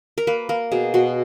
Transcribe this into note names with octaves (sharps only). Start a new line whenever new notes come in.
A#4
A#3 B4
A#3 A#4
B2 G#4
B2 F#4